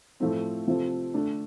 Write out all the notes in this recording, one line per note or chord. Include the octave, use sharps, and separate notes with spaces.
A2 F3 A3 C4
C3 F3 C4 F4 A4
D3 A3 D4